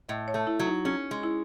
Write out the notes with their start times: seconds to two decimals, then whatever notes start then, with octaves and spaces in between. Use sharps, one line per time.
0.09 A2 D#5
0.28 C#5
0.34 A3
0.47 E4
0.59 F#3
0.67 D#4
0.85 C#4 G#4
1.11 G#3
1.23 E4